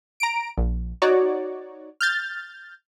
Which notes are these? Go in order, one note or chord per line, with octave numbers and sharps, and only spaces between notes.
A#5 D7
A#1
D#4 F#4 C#5 D5
F6 G6 A6